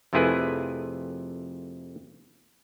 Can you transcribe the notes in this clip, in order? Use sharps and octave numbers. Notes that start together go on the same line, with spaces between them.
F2 C3 A3 E4 G#4 B4